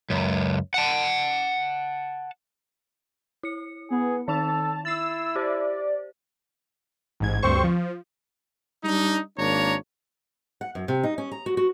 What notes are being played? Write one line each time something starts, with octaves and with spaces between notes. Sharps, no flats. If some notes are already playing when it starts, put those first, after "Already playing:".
C#2 F#2
F#5 A5
E4 C#7
B3 G#4
D#3 D#4 A4 A5 F7
E4 E6 A6 C7
G4 C5 D5
A1 G#2 G#6
D2 G2 C4 C5 C#6
F3
G3 D4 D#4
G#1 A#3 D4 C#5 A#5
F#5
F#2
C3
D#4
C#4
A#5
F#4
F#4